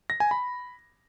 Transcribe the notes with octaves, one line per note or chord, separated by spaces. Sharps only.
A#6
G#5
B5